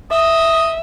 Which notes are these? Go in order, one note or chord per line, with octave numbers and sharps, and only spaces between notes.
D#5 E5 D#6